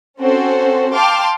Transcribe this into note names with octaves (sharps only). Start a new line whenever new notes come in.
C4 C#4 F#4 A4 C5
F5 G5 A5 C6 D6 F6